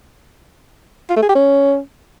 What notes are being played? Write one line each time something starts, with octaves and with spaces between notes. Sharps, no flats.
F4
A3
G#4
G4
C#4